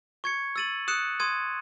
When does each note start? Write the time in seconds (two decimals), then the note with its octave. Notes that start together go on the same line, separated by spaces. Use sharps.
0.24 C#6 G#6 C#7
0.56 E6 A6 D#7 F#7
0.88 D#6 F#6 C#7 E7
1.20 C6 D#6 G#6 D#7